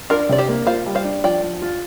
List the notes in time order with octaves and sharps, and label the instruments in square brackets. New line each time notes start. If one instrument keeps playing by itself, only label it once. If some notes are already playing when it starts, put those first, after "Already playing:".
[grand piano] D4 [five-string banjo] F4 A#4
[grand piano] C3 [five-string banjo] D5
[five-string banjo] G4 C5
[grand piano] A#3
[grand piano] F4 [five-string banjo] C5 F5
[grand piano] G3
[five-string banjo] C5 F5
[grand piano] D4
[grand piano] F3 [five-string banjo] D5 G5
[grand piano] F3
F4